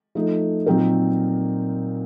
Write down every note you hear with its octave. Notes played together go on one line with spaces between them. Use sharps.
F3 A3 D#4 A4
A#2 F#3 C4 D#4 A#4